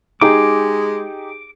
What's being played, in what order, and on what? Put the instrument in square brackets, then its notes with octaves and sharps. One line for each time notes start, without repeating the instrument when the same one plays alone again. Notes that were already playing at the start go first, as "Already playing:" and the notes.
[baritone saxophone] G#3 [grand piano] D#4 G4 G#4 [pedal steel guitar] D6